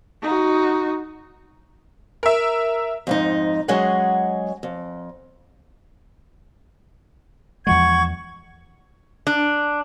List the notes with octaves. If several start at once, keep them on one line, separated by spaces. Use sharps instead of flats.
D#4 F#4
A#4 E5
F2 G#2 D#4
F#3 G#3 C#4 G#4 D#5 F#5
F2
E2 F3 G#3 F#5 C#6 G#6
D4